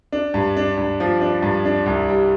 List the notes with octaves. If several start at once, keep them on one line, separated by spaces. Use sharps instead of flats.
D4
G2
D4
G2
F3
D4
G2
D4
C2
G3